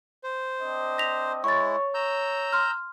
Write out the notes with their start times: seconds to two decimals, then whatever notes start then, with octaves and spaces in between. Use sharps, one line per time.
0.24 C5
0.60 C4 D4 D#5
0.98 A#6 B6 F7
1.44 G#3 E4 C#5 C#6 A6
1.94 A#5 E6 G6
2.53 C6 F6